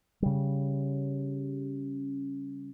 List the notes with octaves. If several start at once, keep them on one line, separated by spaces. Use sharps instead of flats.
C#3 G3